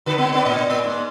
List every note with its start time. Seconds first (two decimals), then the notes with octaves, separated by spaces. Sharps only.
0.06 D3 B4
0.18 C#3 G#3 B3
0.33 B3 D4 B4
0.45 A2 D#5
0.69 A#3
0.84 G#2